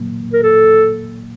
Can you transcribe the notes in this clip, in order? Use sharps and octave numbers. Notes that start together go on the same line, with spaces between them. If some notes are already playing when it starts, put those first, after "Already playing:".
Already playing: A#2 F#3 A#3
A#4
A4